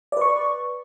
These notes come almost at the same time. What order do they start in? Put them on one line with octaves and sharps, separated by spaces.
D5 B4 C#6